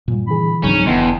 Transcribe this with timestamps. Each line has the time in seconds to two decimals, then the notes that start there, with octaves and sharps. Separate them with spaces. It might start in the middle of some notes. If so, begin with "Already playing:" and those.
0.08 G2 A#2 G3
0.27 D3 E3 G#4 B5
0.64 C#2 G#2 D3 F3 F#3 C4 C#4 D#4
0.87 F1 E2 D3 D#5 G5 A5 C6